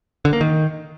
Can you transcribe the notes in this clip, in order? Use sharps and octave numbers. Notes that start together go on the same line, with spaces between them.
D3
A#3
D#3